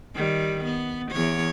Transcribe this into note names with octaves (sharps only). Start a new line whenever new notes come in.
D#3 G3
B3
E2 C#5